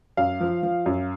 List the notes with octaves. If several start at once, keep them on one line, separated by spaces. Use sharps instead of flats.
F#2 F5
F3
F3
F#2